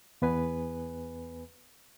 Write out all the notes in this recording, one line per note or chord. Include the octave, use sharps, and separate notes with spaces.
E2 B3 B4 G#5